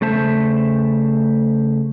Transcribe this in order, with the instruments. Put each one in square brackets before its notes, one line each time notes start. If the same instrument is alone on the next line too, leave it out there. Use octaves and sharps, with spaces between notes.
[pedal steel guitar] C#3 A3 C5 E5 A5